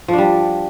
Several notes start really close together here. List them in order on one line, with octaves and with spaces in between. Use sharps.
F3 D4 G3